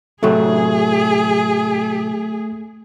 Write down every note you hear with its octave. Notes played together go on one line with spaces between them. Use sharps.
A2 C3 F#3 A3 G#4